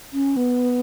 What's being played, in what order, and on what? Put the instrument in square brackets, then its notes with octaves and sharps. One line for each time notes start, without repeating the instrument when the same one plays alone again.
[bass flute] C#4
B3